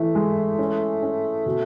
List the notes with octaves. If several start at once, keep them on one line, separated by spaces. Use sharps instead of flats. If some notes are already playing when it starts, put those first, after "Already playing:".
Already playing: E3 A3
G#3
C#4
C#4
B2